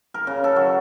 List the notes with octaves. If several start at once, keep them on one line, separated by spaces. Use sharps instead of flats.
A#4
C#3
A4
F#3